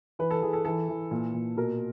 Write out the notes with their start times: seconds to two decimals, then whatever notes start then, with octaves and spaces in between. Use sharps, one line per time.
0.19 E3 B4
0.31 A4
0.42 E3 G#4
0.53 A4
0.65 E3 A4
0.89 E3
1.11 A#2
1.34 A#2
1.57 B2 A#4